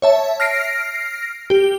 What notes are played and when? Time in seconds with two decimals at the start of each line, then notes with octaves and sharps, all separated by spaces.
0.02 C#5 E5 A5
0.40 F6 A#6 C7 D7
1.50 G4